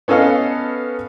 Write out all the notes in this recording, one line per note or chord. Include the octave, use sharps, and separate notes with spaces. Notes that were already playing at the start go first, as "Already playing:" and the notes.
B3 C#4 A4 D#5 F5